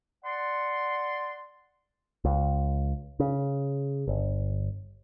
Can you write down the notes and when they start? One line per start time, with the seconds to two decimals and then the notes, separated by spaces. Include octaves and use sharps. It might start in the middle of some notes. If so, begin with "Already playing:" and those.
0.24 D5 F#5 C6
2.25 C#2
3.20 C#3
4.08 G1